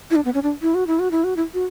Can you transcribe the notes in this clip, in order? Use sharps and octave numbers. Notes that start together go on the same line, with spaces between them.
E4
D4
B3
C#4
D4
E4
F#4
E4
F#4
E4
F#4
E4
F#4